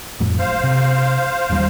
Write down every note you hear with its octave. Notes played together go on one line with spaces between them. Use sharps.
F1 F2 A2
F#1 C5 F5
C3
F#1 D#2 G3